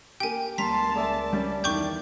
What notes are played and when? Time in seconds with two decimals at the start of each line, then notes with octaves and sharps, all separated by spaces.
0.20 A#3 G4 G5 G#5
0.58 C#2 G3 A#3 A5 A#5 C6 B6
0.95 G#4 D5 E5
1.33 G3 C#4
1.64 E2 D#3 G5 C#6 D6 G6